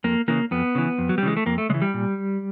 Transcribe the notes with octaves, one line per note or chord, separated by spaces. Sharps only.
F2 A#3
C#3 E3 A#3
F2 B3
C#3 E3
F2
F#3
G3
C#3 E3 G#3
A3
F2 A#3
A3
C#3 E3 G#3
G3
A#2